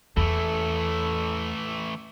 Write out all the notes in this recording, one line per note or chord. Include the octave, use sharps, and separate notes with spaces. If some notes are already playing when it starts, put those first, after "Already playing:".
E2 E3 A3 A4